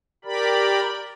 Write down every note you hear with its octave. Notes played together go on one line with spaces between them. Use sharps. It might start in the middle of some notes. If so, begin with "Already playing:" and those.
G4 A#4 D5 B5